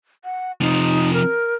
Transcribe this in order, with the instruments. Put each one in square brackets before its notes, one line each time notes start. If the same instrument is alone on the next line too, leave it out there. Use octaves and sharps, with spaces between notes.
[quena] F#5
[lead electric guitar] C3 F3 [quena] D#4
[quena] A#4